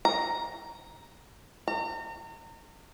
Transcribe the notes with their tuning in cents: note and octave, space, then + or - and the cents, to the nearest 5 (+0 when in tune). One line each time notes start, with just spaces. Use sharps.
A#5 +5
A#5 -40